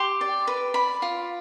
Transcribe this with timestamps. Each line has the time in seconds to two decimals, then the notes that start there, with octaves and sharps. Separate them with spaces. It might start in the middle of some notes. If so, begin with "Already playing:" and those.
Already playing: G4 C6
0.21 D5
0.47 B4
0.74 D5 B5
1.02 F4